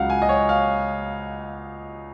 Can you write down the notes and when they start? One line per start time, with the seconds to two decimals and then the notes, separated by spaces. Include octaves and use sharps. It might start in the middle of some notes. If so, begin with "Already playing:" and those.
Already playing: C#2 C#3 F#3 F5 F#5
0.10 G#5
0.22 D#5
0.29 C#5
0.49 F5